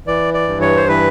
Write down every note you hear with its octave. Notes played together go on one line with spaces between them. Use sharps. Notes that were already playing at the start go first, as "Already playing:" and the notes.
E3 D5
D5
G2
C#5
C5
E3 B4